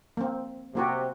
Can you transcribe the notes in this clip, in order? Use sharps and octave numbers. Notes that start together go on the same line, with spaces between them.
A#3 C4
C3 A#3 F#4 G4